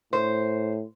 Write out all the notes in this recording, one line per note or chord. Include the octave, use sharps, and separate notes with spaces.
A2 C5